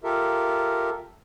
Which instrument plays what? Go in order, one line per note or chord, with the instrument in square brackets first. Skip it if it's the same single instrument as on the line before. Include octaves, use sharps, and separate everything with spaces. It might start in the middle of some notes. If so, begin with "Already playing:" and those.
[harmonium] F4 G4 A4 A#4 E5